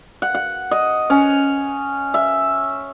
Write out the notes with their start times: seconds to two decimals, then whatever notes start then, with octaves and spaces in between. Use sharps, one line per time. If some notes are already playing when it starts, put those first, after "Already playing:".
0.22 F#5
0.35 F#5
0.71 D#5
1.10 C#4
2.14 E5